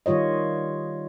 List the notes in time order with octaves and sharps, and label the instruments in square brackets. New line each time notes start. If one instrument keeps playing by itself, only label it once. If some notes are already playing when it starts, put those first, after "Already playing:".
[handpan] D#3 G3 F4 C#5 D#5